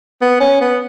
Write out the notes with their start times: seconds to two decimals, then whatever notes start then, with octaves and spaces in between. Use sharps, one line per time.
0.22 B3
0.40 C#4
0.61 B3